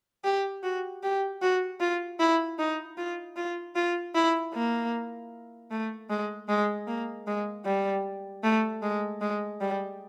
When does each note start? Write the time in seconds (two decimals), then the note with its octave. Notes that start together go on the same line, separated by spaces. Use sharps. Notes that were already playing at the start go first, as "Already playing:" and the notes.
0.24 G4
0.63 F#4
1.03 G4
1.42 F#4
1.80 F4
2.20 E4
2.59 D#4
2.98 F4
3.36 F4
3.75 F4
4.15 E4
4.54 A#3
5.71 A3
6.10 G#3
6.49 G#3
6.88 A#3
7.27 G#3
7.65 G3
8.43 A3
8.82 G#3
9.21 G#3
9.61 G3